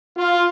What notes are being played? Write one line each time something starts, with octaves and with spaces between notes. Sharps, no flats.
F4